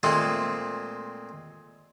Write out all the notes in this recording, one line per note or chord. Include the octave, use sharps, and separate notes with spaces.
A#2 G#3 A3 C4